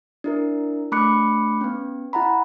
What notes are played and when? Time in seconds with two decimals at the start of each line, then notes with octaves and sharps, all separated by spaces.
0.24 D4 E4 A#4
0.92 A3 D4 B5 D6 F#6 C#7
1.61 B3 C#4
2.13 E4 F#5 A#5 B5